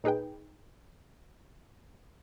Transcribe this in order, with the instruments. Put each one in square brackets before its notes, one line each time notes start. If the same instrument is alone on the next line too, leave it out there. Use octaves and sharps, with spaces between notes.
[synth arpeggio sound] A#2 D#4 G#4 B4 G5